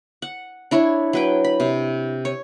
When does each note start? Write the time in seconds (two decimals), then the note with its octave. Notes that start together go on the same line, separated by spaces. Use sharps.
0.22 F#5
0.71 D4 E4 C#5
1.13 F#3 B4 G5
1.44 B5
1.60 C3
2.25 C#5